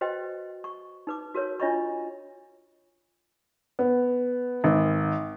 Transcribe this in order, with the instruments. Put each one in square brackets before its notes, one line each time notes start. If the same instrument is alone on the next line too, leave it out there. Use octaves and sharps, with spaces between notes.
[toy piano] F#4 B4 C5 D#5 G5
C#6
D#4 B4 D6
F#4 A#4 B4 C#5
D4 F4 C#5 D#5 B5 C#6
[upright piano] B3
G#1